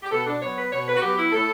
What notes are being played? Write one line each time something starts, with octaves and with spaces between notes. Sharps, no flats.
G4
B2 A4
D4
F#3 B3 C#5
B4
B2 C#5
B4
F#4
F#3 B3 G4
E4
A2 A4